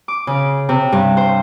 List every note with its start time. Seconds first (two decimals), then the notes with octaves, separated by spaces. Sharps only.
0.08 D6
0.27 C#3
0.69 C3
0.92 G2
1.17 C5